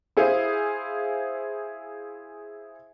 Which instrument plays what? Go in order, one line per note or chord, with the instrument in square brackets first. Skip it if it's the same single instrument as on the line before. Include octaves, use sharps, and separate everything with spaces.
[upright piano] E4 G#4 C5 F5